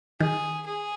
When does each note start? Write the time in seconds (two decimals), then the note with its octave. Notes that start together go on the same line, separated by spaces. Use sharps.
0.20 D#3 G#4
0.66 G#4